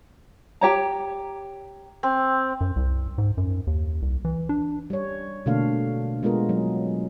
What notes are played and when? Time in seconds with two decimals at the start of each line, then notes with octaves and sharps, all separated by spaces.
0.61 G4 C#5 A#5
2.03 C4
2.61 F#2
2.76 C2
3.18 G#2
3.37 F#2
3.67 D#2
4.02 C2
4.25 E3
4.49 D4
4.90 G3 C#5
5.46 B2 D3 A3 A#3 D4 F5
6.23 G#3 B3 F4 G#4 A#4
6.49 F#3